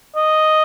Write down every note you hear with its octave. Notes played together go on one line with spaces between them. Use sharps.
D#5